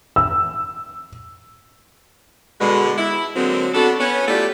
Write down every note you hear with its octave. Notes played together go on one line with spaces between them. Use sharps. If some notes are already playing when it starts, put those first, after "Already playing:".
E6
B2 D3 G#3
E4
D3 F#3 G#3 A#3 C4
B3 D4 F#4 A4
B3 C#4 C#5
F#3 A3 E4 F4 G4 D5